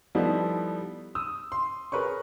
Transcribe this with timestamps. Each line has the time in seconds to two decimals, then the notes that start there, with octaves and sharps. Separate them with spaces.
0.15 F3 G3 A3 B3 D#4 E4
1.15 D#6 E6
1.52 C6
1.92 G#4 A#4 B4 C#5 C#6